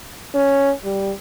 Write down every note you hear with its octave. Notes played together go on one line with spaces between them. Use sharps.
C#4
G3